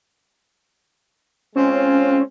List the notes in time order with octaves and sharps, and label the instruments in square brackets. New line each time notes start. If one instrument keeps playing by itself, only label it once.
[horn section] G#3 C4 F4 [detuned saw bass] C#4